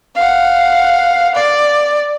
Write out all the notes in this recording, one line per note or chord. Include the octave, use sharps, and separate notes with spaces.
F5 F#5
D5